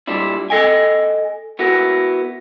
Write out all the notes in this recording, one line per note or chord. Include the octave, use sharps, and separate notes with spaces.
A#2 G3 D4 E4
A4 D#5 G5 G#5
B3 E4 F#4 A#4